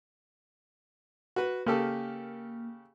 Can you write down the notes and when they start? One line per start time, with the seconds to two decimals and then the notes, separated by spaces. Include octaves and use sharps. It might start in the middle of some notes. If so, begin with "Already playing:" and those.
1.36 F#4 B4
1.67 C#3 A#3 G4 A4